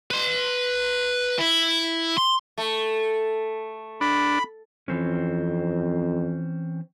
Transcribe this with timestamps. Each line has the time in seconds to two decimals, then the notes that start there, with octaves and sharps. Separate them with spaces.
0.11 B4 C6
1.38 E4
2.18 C6
2.58 A3
4.01 D4 B5
4.88 F2 E3 C4 C#4